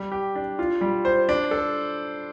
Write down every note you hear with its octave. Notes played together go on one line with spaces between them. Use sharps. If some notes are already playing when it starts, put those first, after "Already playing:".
Already playing: G3
G4
D4
F4
G3
C5
D4
A4